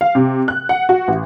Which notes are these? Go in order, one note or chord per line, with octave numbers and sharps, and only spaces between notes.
F5
C3
F#6
F#5
F#4
A1